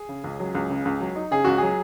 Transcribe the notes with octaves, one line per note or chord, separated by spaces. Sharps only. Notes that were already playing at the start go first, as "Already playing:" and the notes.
Already playing: G#4
C#3
C#2
F#3
C#2
C#3
C#2
F#3
D#4
C#3 G#4
C#2 F#4
F#3 G#4